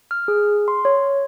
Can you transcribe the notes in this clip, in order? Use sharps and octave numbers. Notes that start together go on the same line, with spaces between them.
F6
G#4
C6
C#5